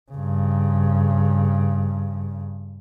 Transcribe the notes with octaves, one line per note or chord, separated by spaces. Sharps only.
G2 C#3